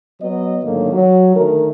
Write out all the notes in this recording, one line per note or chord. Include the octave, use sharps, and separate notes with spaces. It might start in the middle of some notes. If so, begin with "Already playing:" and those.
F#3 B3 D#5
G#2 D3 D#3 F#3 A3 A#3
F#3
D3 D#3 A3 A#4